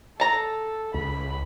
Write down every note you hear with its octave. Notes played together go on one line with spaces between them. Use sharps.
A4 A5 A#5
C#2 B5